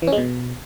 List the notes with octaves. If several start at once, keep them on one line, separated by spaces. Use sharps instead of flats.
E3
C#4
G#3
B2